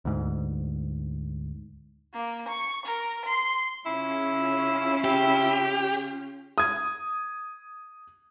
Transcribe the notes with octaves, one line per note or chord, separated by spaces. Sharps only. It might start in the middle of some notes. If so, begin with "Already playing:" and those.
D2 G#2
A#3
C#6
A#4
C6
C#3 C#4 E4 F4
G4
D#6 G#6